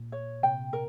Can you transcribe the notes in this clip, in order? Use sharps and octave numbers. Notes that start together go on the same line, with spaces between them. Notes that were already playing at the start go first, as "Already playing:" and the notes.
Already playing: A#2
C#5
C3 G5
A#4